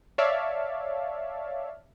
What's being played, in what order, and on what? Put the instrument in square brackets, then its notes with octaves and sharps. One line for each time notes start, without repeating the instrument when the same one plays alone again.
[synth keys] C#5 D5 E5 F5 A5